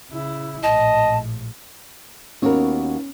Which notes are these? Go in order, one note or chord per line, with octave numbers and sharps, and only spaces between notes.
C#3 E4
A#1 A2 D#5 A5
D#2 B3 C#4 F#4 A#4